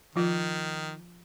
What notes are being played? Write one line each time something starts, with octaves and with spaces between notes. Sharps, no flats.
D#3 F3 F4